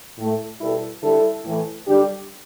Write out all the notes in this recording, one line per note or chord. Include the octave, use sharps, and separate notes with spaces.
A2 A3
B2 G3 E4 A4
D3 G3 E4 A4
A2 E3 A3
D3 G3 D4 G4